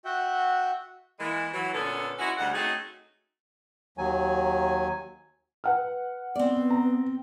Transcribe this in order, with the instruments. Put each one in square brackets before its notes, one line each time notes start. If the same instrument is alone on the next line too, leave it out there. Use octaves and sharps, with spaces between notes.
[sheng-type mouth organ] F#4 E5 F#5 G5
[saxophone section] E3 G#3 A#3
E3 F#3
A#2 D3 B3 C#4 A4
G#3 C#4 E4 F#4
D2 G3 G#3 F#5
A3 C4 C#4 D#4 F#4 G#4
[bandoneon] D#2 F#3 G#5
[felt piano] B4 F#5 F6
[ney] B3 [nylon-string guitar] C4 D5
[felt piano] A#5